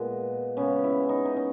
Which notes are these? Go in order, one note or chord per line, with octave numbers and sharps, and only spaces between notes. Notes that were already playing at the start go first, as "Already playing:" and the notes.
Already playing: A#2 G#3 B3
C#3 G#3 B3 C#4
E4
D#4
D#4
C#4